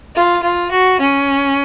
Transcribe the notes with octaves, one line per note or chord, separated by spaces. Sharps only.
F4
F4
F#4
C#4